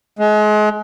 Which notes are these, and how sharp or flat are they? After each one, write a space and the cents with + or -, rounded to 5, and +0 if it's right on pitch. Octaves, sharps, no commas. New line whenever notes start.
G#3 +35